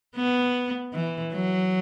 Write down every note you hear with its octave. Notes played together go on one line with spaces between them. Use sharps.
B3
E3
F#3